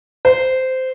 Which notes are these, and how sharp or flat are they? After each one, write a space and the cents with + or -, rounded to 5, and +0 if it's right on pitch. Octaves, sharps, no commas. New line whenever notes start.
C5 -15